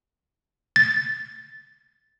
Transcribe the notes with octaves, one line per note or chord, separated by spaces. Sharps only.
A6